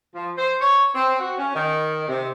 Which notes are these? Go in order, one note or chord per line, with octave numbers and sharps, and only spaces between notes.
F3
C5
C#5
C4
F#4
C#4
D#3
C3